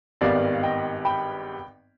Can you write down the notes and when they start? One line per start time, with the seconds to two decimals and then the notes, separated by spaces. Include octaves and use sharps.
0.21 G#1 G2 D#3 G3 B3 D5 F5
0.53 F5
0.63 D#5 G5
1.05 G5 B5